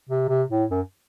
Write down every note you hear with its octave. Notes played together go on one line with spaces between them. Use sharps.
C3
C3
A2
F#2